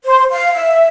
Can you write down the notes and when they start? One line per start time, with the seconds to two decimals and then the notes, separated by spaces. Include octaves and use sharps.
0.04 C5
0.31 F5
0.54 E5